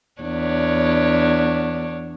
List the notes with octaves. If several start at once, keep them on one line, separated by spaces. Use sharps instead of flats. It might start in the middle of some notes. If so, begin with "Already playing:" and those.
E2 D4 C#5